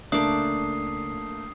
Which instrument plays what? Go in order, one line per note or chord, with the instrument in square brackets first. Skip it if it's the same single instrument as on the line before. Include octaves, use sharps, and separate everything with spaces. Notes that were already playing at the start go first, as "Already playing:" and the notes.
[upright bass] C#2 C#3 [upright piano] A3 A#3 [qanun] D4 D6 [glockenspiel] D#6 C7